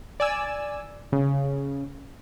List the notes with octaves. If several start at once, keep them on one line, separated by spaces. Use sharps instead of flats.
D5 G#5 E6
C#3